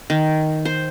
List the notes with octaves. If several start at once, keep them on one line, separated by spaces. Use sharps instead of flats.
D#3
C5